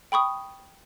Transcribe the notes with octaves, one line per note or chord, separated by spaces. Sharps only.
G5 B5 C#6 D#6